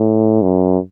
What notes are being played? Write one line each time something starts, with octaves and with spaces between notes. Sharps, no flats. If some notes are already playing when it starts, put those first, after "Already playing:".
Already playing: A2
F#2